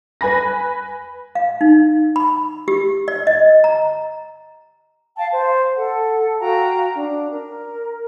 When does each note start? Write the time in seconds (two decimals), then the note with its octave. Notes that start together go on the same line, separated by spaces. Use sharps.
0.21 B4 G#5 B5 A#6
1.35 F5
1.61 D#4
2.16 B5
2.68 G4
3.08 D5
3.27 D#5
3.64 A#5
5.16 F5 G5 A5
5.31 C5
5.76 A4 F#5
6.39 F#4 F5 G5 A#5
6.93 D4
7.29 A#4